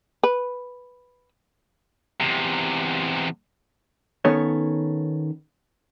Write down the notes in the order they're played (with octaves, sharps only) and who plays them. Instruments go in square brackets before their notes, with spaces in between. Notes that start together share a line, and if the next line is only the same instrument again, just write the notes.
[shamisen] B4
[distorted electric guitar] E2 C3
[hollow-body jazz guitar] D#3 B3 C#4 A4 C#5